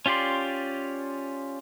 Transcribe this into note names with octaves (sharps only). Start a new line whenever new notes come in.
C#4 F4 G4 D5 C6